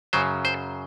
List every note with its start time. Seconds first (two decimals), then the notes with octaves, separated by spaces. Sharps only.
0.13 F#2 C#3 F#3 C5
0.45 C5